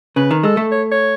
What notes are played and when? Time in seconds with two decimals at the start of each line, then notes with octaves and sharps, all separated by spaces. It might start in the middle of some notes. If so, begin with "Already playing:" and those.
0.16 C#3 B4
0.31 D#3
0.43 G#3 A4
0.57 A3
0.71 C#5
0.91 C#5